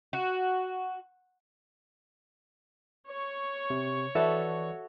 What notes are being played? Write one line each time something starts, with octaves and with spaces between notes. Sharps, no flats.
F#4
C#5 C#6
C3
E3 F#4 A4 B4 D5 E5